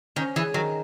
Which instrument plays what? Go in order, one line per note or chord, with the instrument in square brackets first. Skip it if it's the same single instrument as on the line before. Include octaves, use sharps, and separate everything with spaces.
[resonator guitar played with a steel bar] D#3 [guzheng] C#4
[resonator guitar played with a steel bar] E3 [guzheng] G#4
[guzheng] D#3 [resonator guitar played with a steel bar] F#3